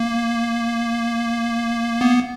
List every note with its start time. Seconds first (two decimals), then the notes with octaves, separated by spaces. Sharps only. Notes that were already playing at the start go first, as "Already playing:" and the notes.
Already playing: A#3
2.01 B3